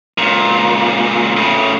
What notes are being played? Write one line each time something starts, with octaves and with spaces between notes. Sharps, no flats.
C#2 A#2
A2 C#3